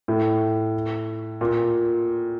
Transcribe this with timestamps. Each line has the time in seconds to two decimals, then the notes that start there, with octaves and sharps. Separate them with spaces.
0.08 A2
1.41 A#2